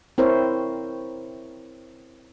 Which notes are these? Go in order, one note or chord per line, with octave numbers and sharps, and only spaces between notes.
C4 E4 A#4 C5 C#5